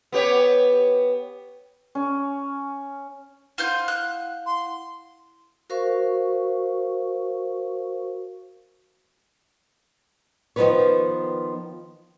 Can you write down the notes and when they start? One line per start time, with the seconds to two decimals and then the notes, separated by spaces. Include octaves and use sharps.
0.12 B3 G4 C#5
1.95 C#4
3.58 E4 F4 C5 F5 F#5 G6
3.88 F#6
4.46 C6
5.70 F#4 A#4 C5 F5 C#6
10.56 D#3 F3 A3 B3 B4 C#5